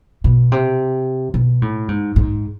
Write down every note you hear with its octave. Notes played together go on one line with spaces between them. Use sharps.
B2
C3
B2
A2
G#2
G#2